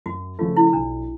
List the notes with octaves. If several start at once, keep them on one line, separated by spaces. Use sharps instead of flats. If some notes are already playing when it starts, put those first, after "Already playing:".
F#2 F#4
C#3 F3 A3 F4
E4
B1 D4